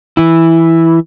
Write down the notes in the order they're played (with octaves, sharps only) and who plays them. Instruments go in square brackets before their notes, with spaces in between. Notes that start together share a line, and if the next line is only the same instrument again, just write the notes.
[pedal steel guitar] E3 E4